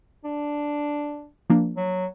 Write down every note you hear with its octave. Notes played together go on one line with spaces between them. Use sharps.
D4
F3 A#3 D4
F#3